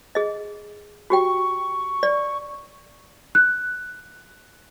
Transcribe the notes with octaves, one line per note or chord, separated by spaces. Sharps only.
G#4 D#5
F#4 G4 G5 C#6
D5
F#6